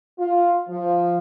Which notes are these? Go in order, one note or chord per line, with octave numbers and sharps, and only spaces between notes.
F4
F3